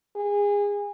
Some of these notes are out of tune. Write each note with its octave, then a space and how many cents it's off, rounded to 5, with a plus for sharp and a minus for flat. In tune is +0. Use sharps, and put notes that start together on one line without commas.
G#4 -25